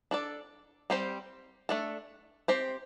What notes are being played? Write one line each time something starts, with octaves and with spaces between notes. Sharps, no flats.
D4 A4 D5
G3 C4 G4 C5
A3 D4 A4
C4 G4 C5